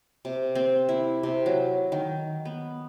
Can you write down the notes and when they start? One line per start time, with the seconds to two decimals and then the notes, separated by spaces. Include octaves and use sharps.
0.25 C3
0.55 C4
0.89 E4
1.23 C3
1.46 F#3
1.92 D#3
2.45 B3